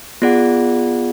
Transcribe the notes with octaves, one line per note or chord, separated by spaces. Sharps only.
B3 F4 G#4 D5 F#5